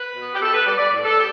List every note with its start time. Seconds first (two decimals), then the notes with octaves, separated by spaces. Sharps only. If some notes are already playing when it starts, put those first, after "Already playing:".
Already playing: B4
0.16 B2 B3
0.35 G4
0.42 B2 A4
0.54 B4
0.66 G3 B3 D5
0.79 D5
0.92 A2
1.04 A4
1.16 B3 G4